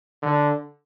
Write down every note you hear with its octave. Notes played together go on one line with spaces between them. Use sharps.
D3